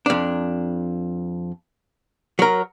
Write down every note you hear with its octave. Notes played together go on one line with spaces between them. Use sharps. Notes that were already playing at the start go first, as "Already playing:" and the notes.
F2 D4
F#3 A#4